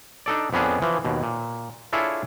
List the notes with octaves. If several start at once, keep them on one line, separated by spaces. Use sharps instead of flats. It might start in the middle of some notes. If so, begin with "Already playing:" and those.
D4 D#4 A4 D5
F2 B3 C#4 D4 G#4
E3 F3
D#2 B2
A#2
D4 E4 F4 G#4 A4 C#5